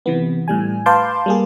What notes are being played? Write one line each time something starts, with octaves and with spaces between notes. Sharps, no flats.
C3 E3 B3
A2 G3 G#5
B4 F5 A5 C6 D6 G6
G3 A#3 G#4